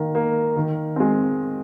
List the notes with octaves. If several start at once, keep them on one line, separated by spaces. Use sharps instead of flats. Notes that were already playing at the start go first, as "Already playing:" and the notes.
Already playing: D#3 A#3
A#3
D#3
G#3 C4